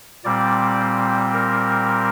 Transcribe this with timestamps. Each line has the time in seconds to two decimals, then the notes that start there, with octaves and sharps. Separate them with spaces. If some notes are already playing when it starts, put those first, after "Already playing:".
0.24 A#2 G3 C4 D5
1.33 A#4